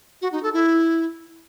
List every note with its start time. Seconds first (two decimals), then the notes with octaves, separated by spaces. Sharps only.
0.22 F#4
0.32 D#4
0.43 A4
0.53 E4